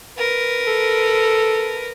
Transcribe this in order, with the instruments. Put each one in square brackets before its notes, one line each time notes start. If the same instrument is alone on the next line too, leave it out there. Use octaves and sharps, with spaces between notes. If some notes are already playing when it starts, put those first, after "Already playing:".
[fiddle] A#4 B4
[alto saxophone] A4